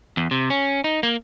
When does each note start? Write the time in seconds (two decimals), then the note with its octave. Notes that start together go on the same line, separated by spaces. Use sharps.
0.17 E2
0.31 C3
0.50 C#4
0.84 D#4
1.03 A#3